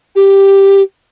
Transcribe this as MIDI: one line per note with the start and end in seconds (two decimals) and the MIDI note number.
0.16 0.82 67